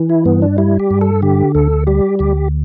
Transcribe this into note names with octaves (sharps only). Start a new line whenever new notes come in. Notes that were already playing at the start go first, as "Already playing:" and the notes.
Already playing: E3
E4
G2 B3
D4
G3 E4
G4
G2
A4
D3 G4
D2 A4
G3 G4
D2 G4